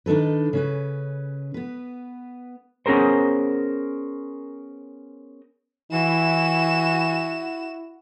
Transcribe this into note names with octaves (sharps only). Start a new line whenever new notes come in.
D#3 D4 D#4 A4 B4
C#3 C#4 B4
B3 B4
B3 C#4 G#4 A#4 C5
E3 E4 F#4 E7